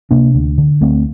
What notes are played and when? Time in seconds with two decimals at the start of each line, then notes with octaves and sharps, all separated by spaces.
0.11 C3 A#3 D4
0.35 D2
0.58 D3
0.81 D2 A3 C4